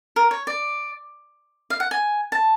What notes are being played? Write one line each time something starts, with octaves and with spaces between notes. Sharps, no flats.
A#4
C#5
D5
F5
F#5
G#5
A5